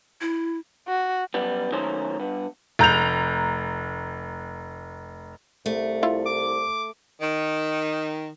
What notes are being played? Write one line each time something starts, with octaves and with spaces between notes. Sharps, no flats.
E4
F#4
F#2 G3 B3
D#3 F#3 A3 A#3 C#4 C5
G2 B3
F1 A#5 G6 F7
C2 A3
E4 F4
D6
D#3